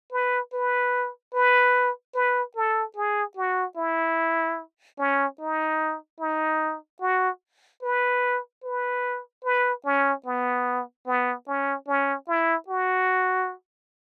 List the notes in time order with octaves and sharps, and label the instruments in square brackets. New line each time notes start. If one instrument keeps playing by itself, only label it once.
[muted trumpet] B4
B4
B4
B4
A4
G#4
F#4
E4
C#4
D#4
D#4
F#4
B4
B4
B4
C#4
B3
B3
C#4
C#4
E4
F#4